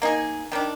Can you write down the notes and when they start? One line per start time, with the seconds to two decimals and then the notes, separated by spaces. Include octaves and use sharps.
0.02 A#3 D#4 G#4
0.52 D#3 G3 D4